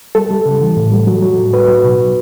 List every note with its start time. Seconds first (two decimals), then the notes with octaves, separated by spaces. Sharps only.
0.15 G3 A4
0.30 G3
0.45 C#3
0.61 E3
0.77 A2
0.92 G3
1.07 F#3
1.22 F#3
1.38 A2
1.53 F#3 B4
1.68 F#3
1.84 B2
2.00 F#3